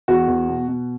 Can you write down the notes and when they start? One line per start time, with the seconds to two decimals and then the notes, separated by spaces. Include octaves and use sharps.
0.08 E2 F#4
0.28 E2
0.49 B2
0.68 B2